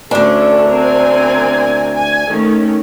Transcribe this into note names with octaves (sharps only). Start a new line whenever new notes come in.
D2 C#4 D4 A4
C4 A#4 G#5
G#5
D#3 A3 C#4